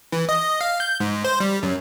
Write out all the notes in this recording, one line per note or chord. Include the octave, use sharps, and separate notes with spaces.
E3
D#5
F5
G6
G#2
C5
G3
F#2